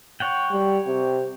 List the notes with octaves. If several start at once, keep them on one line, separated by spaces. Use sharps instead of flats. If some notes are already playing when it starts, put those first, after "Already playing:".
C#5 F#5 G5
G3
C3